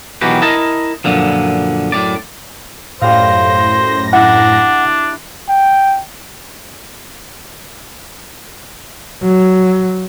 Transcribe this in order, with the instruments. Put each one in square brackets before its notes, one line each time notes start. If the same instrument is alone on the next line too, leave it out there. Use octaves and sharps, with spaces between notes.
[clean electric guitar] B1 D#3 E3 F#4 G4
E4 A#4 D#5 A5
F#2 A#2 D3 F3
F#2 A2 D5
[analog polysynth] F#2 A2 A#6 [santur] G3 F5 [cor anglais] C5
[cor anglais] D4 [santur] E4 E6 [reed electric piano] F#5
[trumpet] G5
[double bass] F#3